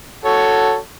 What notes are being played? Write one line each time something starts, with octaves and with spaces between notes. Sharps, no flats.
F#4 A4 C#5